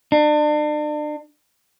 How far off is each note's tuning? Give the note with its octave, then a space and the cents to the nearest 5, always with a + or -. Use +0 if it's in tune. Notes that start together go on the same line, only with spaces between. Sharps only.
D4 +35